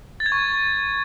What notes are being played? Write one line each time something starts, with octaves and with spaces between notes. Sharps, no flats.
A6
G#6
C#6